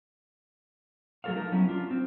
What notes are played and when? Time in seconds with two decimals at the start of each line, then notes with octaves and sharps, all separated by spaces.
1.24 F#3 A3 G#4 A4 C#5 F5
1.36 D#4 A4 A#4
1.52 F#3 B3 C#4 E4
1.69 D4 F4
1.91 C4